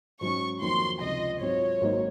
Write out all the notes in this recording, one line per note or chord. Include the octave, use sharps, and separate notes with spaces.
G#2 F#3 C#4 C#6
F2 D#3 F#3 A#3 C6
C#2 C3 F3 D#5
G#2 F#3 C4 F4 C#5
G#1 G#2 F#3 A#3 D#4